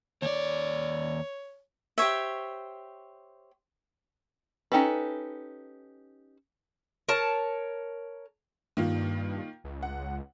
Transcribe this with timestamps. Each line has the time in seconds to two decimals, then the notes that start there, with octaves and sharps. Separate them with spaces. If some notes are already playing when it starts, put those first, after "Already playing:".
0.22 D#2 C#5 D5
1.98 G4 C5 C#5 E5
4.72 C#4 D#4 G4 A4 B4
7.08 A#4 C#5 A5
8.77 G2 D#3 A#3 F4
9.64 C#2
9.83 F#5